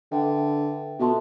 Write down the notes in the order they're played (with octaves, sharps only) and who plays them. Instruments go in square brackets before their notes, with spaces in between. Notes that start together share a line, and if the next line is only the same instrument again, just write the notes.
[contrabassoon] D3 [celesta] B4 E5 G5
[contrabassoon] B2 [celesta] F4 A4 E5 A5 C6